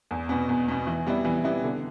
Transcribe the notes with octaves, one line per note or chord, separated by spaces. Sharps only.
E2
B2 B3
E2
B2 B3
E3
G3 B3 E4
E3
G3 B3 E4
D3